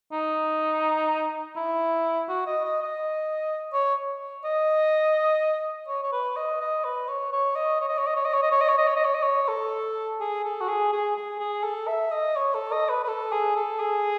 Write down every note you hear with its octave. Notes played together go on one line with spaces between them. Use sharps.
D#4
E4
F#4
D#5
D#5
D#5
C#5
D#5
C#5
C#5
B4
D#5
D#5
B4
C#5
C#5
D#5
C#5
D#5
C#5
D#5
C#5
D#5
C#5
D#5
C#5
D#5
C#5
D#5
C#5
D#5
C#5
D#5
C#5
A4
G#4
A4
F#4
G#4
G#4
G#4
G#4
A4
E5
D#5
C#5
A4
D#5
B4
B4
A4
G#4
A4
G#4